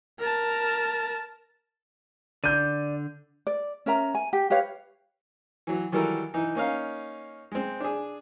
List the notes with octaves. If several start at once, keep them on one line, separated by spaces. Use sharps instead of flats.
A#4 A5
D3 D5 G6 D#7
D5
C#4 A#4 E5 A#5
G#5
G4
G4 B4 C#5 F5
E3 F#3
D#3 E3 F#3 G3 A4 A#4
E3 D#4
A#3 C#4 D#4 F5
G#3 C4
D4 G#4